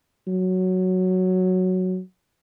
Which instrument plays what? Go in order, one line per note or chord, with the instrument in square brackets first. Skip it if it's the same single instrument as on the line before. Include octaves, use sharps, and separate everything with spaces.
[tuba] F#3